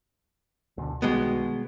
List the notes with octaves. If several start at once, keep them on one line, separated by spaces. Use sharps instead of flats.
D2 B2 D3
B1 B2 D#3 G3 G#3 B3